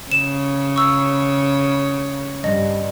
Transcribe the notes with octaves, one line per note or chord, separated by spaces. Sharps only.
C#3 C#5 E7
C#6 E6
G2 D#5